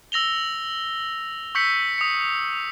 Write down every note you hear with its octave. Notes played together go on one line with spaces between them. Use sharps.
E6 A#6 F7 G7
C#6 E6 G6 B6 C#7
D#6 C#7